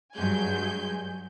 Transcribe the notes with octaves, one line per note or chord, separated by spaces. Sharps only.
G2 F#3 G#3 G#5 G6